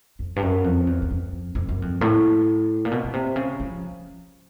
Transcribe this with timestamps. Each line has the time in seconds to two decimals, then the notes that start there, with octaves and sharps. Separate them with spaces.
0.19 F2
0.36 G2
0.42 F#2
0.64 F2
0.87 E2
1.02 E2
1.11 F2
1.55 F2
1.69 F#2
1.82 F2
2.01 A2
2.85 A#2
2.92 B2
3.04 B2
3.13 C3
3.36 C#3
3.60 F3